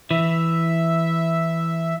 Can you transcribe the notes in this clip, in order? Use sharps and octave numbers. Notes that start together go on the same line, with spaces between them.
E3 E5